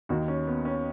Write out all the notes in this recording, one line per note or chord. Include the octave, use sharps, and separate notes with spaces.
D#2 D#3 F#4
C#4
B3
C#4